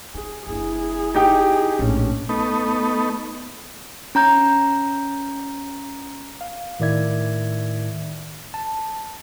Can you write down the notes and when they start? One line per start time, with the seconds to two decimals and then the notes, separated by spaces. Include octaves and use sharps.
0.15 E4 G#4
0.47 F#1 D4 E4 G#4
1.15 D#4 G4 G5
1.79 A#1 A2 C#4 D4
2.29 A3 B3 D#4
4.15 C#4 A#5 G6
6.41 F5
6.80 A2 D#3 E4 D5 E5 G#6
8.54 A5